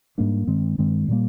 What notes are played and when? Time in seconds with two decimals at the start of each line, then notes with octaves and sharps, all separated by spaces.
0.18 G#2 G3 A#3 D4
0.47 G2 D#3 G#3 C4
0.78 G2 D#3 G#3 C4
1.09 A#2 G3 A#3